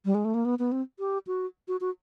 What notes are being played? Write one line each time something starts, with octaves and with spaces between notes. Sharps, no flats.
G3
G#3
A3
A#3
B3
B3
C4
G4
F#4
F#4
F#4